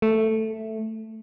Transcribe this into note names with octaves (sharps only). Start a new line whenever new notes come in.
A3